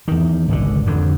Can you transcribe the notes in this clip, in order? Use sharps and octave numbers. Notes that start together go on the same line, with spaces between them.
E2 D#3
G#1 C#2 B2 D3
F2 D3